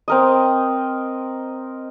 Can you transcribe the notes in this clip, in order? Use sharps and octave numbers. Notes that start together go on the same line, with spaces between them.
C4 A#4 D#5